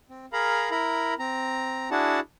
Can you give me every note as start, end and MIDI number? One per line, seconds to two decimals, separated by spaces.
0.10 0.26 60
0.33 0.71 68
0.33 0.71 70
0.33 0.71 77
0.33 0.71 82
0.33 0.71 83
0.71 1.14 64
0.71 1.14 70
0.71 1.14 82
0.71 1.14 83
1.19 1.89 60
1.19 1.89 82
1.91 2.20 62
1.91 2.20 64
1.91 2.20 66
1.91 2.20 68
1.91 2.20 78
1.91 2.20 81